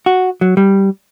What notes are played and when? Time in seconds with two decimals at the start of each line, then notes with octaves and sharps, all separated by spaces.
0.06 F#4
0.41 F#3
0.57 G3